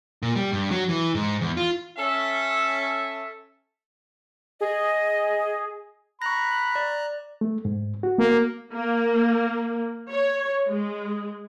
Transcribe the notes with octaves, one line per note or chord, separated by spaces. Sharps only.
A#2
G3
G2
F#3
E3
G#2
E2
F4
C#4 A4 E5
G#4 D#5
A#5 B5 C#6 F#6 A#6
D5
A3
G#2
F#4
A#3
A#3
C#5
G#3